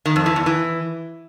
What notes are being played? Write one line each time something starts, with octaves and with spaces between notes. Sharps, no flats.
D#3
F2
E3
E2
E3